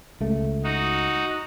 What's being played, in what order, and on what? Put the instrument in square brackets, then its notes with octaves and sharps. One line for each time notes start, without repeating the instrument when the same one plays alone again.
[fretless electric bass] C#2 A3
[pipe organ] D#4 F#4